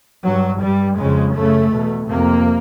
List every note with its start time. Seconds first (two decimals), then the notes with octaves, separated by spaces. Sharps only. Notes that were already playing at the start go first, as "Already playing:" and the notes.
0.24 G2 F#3
0.61 G2 G3
0.98 F2 C#3 G#3
1.34 F#2 C#3 A3
1.72 E2 B2
2.08 F2 C3 A#3